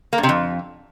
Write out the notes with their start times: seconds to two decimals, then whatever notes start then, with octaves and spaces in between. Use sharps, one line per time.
0.13 A#3
0.18 G2
0.23 C3
0.29 F2